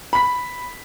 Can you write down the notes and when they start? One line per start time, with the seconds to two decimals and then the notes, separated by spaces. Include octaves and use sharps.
0.13 B5 B6